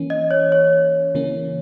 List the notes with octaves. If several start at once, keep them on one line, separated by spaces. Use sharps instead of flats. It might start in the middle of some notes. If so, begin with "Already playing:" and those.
Already playing: E3 A#3 C#4
D#5
C#5
C#5
C#3 E3 A#3 C#4